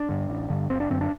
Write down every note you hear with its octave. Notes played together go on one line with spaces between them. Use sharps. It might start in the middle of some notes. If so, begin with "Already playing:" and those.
Already playing: D4
G2 D3
A1
G2 D3
F#1 C4
D4
F#2 D3 C4
D4